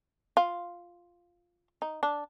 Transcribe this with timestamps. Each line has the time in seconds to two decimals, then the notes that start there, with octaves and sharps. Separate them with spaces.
0.37 F4
1.82 D#4
2.03 D4